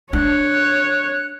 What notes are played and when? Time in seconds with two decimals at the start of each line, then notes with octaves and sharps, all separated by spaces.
0.13 D4 C#5 F#6